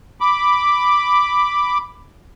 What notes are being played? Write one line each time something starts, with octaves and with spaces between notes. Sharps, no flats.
B5 D6